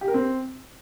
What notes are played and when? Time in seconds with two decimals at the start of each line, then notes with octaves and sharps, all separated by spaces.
0.01 G4
0.08 A#4
0.14 C4